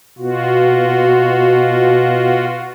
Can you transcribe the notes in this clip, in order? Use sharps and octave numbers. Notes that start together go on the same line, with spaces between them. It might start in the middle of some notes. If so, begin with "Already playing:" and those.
B2 F4 F#4